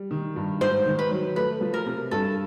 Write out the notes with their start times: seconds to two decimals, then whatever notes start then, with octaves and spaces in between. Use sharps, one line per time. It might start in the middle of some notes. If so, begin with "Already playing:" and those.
Already playing: G3
0.11 D#3
0.36 G2
0.61 G#2 C5
0.86 D#3
0.99 B4
1.11 F#3
1.36 A3 B4
1.61 F3
1.74 A#4
1.86 C3
2.11 G2 A4